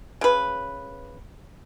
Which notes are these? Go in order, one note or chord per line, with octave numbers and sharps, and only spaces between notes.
C#3 B4